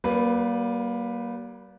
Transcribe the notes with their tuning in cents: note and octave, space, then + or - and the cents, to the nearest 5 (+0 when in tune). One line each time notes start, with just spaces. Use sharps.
G3 -35 A#3 +25 B4 +0